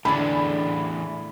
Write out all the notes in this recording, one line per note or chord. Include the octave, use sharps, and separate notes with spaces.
A2 D3 E3 D4 G#4 B5